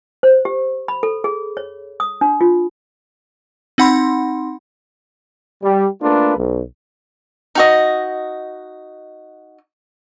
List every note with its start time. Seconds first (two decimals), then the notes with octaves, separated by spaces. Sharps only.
0.23 C5
0.45 G4
0.88 B5
1.03 A4
1.24 G#4
1.57 C#5
2.00 D#6
2.21 D4
2.41 F4
3.78 C4 D#4 F#5 B5 C6
5.63 G3
6.03 A3 A#3 D4 F4 A4 B4
6.37 B1
7.55 D#4 F#4 D#5